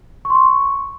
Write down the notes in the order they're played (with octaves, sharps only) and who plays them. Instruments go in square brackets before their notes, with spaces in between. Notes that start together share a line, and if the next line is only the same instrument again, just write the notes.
[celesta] C#6
C6
C#6